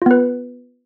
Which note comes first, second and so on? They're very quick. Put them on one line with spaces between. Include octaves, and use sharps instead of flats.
F4 B3 B4